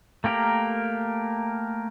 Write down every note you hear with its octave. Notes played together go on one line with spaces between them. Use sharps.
A3 A#3 G4 A#4